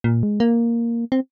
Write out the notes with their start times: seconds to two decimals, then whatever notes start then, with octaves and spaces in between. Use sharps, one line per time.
0.04 A#2
0.23 G#3
0.40 A#3
1.12 C4